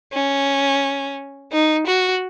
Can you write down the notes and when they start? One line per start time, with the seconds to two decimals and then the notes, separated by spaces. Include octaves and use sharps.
0.13 C#4
1.52 D#4
1.87 F#4